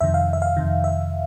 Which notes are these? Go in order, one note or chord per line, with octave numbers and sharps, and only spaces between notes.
F2 C3 D#3 E5
F5
E5
F5
F2 C3 D#3
E5